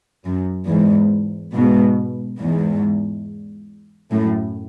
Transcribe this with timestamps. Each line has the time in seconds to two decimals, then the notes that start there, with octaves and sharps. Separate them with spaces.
0.24 F#2
0.67 E2 G#2
1.53 G#2 B2
2.39 E2 G#2
4.11 F#2 A2